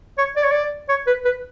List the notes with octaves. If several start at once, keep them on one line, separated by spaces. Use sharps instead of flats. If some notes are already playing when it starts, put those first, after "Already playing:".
C#5
D5
C#5
D5
C#5
B4
B4